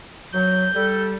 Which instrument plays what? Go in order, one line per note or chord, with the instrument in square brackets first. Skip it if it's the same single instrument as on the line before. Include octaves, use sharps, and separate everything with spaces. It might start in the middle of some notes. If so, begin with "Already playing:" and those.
[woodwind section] F#3 [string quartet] G6
[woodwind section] G3 A4